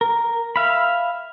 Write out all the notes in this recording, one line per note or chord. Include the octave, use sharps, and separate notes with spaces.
A#4
E5 F5 B5